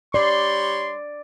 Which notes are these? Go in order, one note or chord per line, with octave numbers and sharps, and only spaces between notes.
G3 C#5 D5 C6